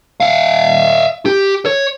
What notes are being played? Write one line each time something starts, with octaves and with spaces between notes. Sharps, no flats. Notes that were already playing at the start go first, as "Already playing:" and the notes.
E5 F5
G4
C#5